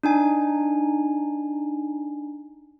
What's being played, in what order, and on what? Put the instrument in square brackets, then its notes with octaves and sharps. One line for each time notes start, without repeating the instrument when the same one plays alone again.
[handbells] D4 D#4 G#5